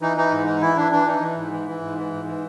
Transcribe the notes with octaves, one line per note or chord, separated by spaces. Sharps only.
E3 D#4
E3 D#4
G#2
E3 D#4
E3 E4
E3 D4
E3 D4
E3 D#4
E3
G#2
E3
E3
G#2
E3
G#2
E3